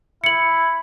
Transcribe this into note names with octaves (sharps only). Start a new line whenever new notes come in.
E4 C#7 F#7